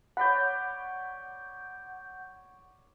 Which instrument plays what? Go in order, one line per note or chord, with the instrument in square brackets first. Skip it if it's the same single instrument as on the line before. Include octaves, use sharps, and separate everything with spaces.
[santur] C#5 D5 B5 [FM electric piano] F#5 G6